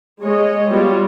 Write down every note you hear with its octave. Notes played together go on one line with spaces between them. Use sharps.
G#3 C#5 D#5
G3 B3 F4 F#4 C#5